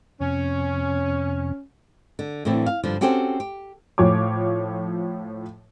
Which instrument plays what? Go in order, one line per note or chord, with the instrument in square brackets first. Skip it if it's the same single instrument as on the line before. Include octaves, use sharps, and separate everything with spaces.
[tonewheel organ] F2 C3 [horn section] C#4
[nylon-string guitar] D3
A2 D3 E3 C4
F5
G2 D3 F3
C4 C#4 F#4 G4 A4 C5
G4
[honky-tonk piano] A2 F3 C#5 D6